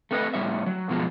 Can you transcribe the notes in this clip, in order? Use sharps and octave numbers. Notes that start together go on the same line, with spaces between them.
A3 C4 B4 C#5 D#5
A2 G3 C#4 E5
F#3
F#2 B2 F3 G#3